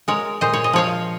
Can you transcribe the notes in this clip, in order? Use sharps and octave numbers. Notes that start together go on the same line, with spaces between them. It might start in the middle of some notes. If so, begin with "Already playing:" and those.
G#3 A#4 C#5
A#2 C5 D#5
C#5
D#5
F3 C#5 F5